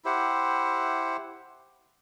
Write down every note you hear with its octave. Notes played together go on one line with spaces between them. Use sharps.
E4 G4 C5 F#5